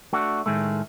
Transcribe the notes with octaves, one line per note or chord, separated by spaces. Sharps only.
A3 D4 F#4
A2 D#3 G#3 A3